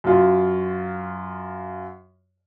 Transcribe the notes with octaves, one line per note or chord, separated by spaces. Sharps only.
F#2 F4